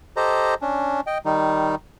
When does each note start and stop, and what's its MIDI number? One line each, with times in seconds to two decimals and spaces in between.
0.17 0.54 67
0.17 0.54 69
0.17 0.54 72
0.17 0.54 75
0.17 0.54 82
0.61 1.01 61
0.61 1.01 62
1.07 1.18 75
1.07 1.18 79
1.25 1.75 51
1.25 1.75 55
1.25 1.75 63